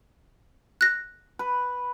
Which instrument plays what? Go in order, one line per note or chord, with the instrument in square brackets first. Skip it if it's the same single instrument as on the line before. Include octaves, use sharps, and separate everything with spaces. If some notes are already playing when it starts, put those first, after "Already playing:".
[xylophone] F#6 A#6
[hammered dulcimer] B4